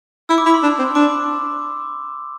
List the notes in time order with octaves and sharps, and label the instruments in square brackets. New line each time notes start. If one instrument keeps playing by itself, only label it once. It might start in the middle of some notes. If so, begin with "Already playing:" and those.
[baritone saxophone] E4 [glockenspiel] E6
[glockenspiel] D6
[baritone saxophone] E4 [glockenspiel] B5
[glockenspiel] C6
[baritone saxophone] D4
C4
[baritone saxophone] D4 [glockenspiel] D6